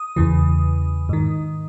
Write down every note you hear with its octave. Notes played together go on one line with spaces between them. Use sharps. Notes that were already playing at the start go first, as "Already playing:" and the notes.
Already playing: D#6
E2 C#3 E3
G#2 D#3